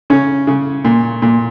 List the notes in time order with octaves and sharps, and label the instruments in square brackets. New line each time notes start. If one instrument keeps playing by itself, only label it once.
[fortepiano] C#3 C#4
C#3
A#2
A#2